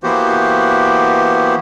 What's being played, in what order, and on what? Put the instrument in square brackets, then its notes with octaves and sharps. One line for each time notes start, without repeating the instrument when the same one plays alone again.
[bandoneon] E3 A#3 B3 F#4 G4 C5